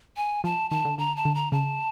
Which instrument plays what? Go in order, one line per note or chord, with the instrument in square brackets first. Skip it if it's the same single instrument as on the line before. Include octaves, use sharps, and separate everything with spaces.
[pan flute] G#5
[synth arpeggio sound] F3 [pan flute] A5
[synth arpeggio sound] D#3 [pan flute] A5
[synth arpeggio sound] D3
[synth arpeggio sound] D3 [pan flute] A#5
[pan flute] A5
[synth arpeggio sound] D3
[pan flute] A#5
[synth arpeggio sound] C#3 [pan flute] A5